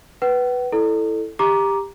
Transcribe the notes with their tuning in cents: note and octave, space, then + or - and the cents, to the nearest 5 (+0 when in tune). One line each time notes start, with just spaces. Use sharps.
B4 +0 F#5 +45
E4 +0 A4 +0 D5 +40
G4 +20 A#5 +10 D6 +0